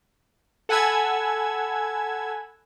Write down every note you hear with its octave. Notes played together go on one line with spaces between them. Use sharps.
A4 F#5 G#5 B5 E6 G#6